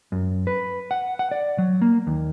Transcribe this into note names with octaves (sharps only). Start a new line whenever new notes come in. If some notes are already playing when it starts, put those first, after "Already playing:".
F#2
B4
F#5
F#5
D5
F#3
A#3
D#2